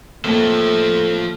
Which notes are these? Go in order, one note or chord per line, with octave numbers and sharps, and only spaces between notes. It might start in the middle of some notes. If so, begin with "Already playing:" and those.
A2 F3 A3 A#3 A4 A5